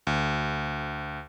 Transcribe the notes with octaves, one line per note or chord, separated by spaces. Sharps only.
D2